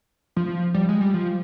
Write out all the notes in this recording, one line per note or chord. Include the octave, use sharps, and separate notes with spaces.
F3
G3
G#3
G3
F3